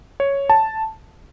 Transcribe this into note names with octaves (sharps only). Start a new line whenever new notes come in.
C#5
A5